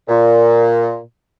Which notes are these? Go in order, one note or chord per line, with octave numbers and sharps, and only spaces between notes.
A#2